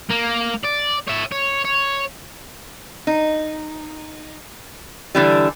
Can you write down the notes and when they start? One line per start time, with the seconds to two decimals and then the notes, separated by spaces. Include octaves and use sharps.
0.11 A#3
0.64 D5
1.08 C#5 E5
1.32 C#5
1.65 C#5
3.07 D#4
5.15 D3 E3 G3